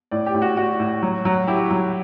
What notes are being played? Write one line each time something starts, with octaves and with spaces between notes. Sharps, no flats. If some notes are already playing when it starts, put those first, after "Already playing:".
A2 D5
G4
A2
F#4
A2 F#4
A2
F#3
F#3
E4 G4
F#3